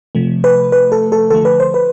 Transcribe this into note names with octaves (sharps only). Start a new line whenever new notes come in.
C3 F3 A3
B4
B4
A4
A4
D3 F3 A3 A4
B4
C5
B4